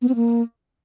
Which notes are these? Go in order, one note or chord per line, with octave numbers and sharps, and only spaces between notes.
B3
C4
A#3